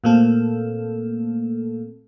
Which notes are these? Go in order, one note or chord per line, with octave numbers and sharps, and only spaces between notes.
A#2 A3 A#3 C4 A4